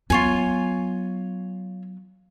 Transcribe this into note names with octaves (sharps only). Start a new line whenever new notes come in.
F#3 B3 F4 C#5 G#5